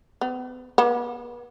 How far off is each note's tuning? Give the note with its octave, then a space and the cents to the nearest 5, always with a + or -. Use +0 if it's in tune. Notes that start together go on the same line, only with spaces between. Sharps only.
B3 +40
B3 -40